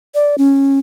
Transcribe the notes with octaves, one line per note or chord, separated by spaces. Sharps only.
D5
C#4